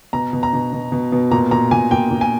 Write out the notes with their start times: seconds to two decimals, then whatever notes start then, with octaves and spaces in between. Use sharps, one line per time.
0.13 B2 A#5
0.33 B2
0.43 A#5
0.53 B2
0.73 B2
0.92 B2
1.12 B2
1.31 A#2 A#5
1.51 A#2 A#5
1.71 A#2 G#5
1.91 A#2 G5
2.11 A#2
2.21 G#5